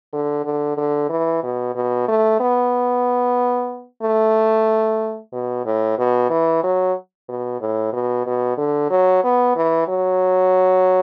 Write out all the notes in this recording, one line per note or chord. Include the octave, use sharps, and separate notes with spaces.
D3
D3
D3
E3
B2
B2
A3
B3
A3
B2
A2
B2
E3
F#3
B2
A2
B2
B2
D3
F#3
B3
E3
F#3